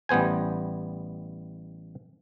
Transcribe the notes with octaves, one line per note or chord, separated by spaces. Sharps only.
A1 G3 B3 C5 G#5